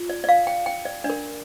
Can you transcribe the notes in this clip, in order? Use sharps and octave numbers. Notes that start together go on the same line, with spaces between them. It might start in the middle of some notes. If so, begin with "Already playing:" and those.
Already playing: F4
D5
D5
F5
G5
G5
D5
D4 D5
A#4